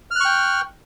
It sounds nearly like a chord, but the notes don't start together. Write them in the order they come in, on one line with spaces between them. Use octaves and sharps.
F6 F#6 C#6 G5